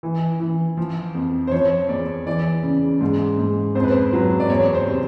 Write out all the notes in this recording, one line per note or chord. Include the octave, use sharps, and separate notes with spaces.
E3
E3
F3
F2
C5
F3 C#5
E2 D5
E3 D5
C#3
G#2
G#2
F2 C5
B4
C5
F#3 B4
D5
E2 C#5
C5
C3